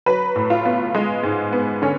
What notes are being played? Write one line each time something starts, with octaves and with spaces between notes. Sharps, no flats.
F#3 B4
A2
F4
B3
G#3
G#2
B3
D3 C#4